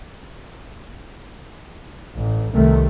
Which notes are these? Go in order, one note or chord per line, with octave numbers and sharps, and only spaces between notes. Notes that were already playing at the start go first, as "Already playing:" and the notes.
A1
C2 C3 D#3 A3